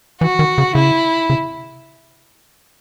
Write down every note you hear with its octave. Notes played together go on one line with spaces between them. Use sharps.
E3 F#4
D#3
C#3
C#3 E4
C#3